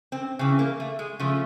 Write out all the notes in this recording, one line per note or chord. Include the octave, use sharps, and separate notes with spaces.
C4
C#3 E3 C4
A#3
A3
G#3
C#3 F3 A3